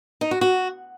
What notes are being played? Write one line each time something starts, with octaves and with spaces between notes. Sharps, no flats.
D#4
F#4
F#4